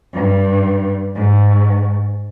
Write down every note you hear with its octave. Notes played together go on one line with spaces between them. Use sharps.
G2
G#2